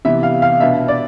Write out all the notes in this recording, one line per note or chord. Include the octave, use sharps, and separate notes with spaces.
C3 E3 B3 E5
F5
F5
B2 B3 D4 E5
D5